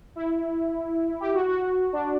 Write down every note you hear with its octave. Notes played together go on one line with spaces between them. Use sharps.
E4
G4
F#4
F#4
F#4
D4